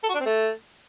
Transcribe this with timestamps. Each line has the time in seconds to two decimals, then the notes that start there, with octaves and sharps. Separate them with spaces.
0.03 A4
0.09 F#4
0.15 D4
0.20 C4
0.26 A3